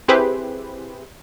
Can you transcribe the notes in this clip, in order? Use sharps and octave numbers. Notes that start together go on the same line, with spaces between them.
C4 E4 G4 G#4 B4 C5